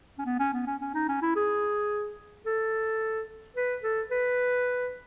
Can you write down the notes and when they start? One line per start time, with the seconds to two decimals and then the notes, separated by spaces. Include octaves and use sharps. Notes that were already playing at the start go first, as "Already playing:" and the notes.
0.18 C#4
0.26 B3
0.39 C#4
0.53 B3
0.67 C#4
0.81 C#4
0.94 D#4
1.08 C#4
1.22 E4
1.36 G#4
2.46 A4
3.56 B4
3.83 A4
4.11 B4